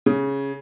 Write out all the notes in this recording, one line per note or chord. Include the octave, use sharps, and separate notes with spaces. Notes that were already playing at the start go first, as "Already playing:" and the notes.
C#3